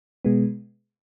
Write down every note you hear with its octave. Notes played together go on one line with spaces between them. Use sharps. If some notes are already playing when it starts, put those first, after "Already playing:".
B2 G#3 B3